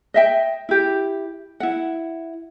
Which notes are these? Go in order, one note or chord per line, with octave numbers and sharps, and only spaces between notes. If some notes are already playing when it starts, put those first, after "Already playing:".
D#5 E5 G5
E4 G4
E4 F#5